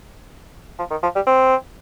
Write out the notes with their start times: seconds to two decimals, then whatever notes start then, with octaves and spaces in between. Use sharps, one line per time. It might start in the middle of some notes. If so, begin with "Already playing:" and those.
0.79 F3
0.91 D#3
1.03 F3
1.15 G3
1.27 C4